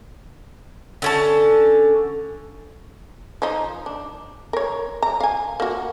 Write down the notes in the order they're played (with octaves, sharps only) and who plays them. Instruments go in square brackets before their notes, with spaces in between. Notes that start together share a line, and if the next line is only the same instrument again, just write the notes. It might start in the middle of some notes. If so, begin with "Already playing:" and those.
[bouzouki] D3 C#4 A5
[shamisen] F3 D#4
D4
A#4 C#5
A#5
F5 G#5
A#3 F#4